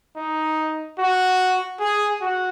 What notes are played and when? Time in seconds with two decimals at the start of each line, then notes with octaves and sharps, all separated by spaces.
0.16 D#4
0.99 F#4
1.80 G#4
2.21 F#4